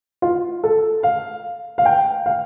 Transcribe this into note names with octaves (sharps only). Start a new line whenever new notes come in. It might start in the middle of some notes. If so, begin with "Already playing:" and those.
F4
A4
F5
F5
G5
F5